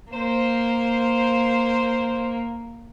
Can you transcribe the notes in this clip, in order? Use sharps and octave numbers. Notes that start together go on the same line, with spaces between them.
A#3 C5